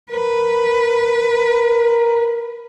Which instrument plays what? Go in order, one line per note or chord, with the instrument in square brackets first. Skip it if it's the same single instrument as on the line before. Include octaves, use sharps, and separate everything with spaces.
[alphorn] A#4 [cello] B4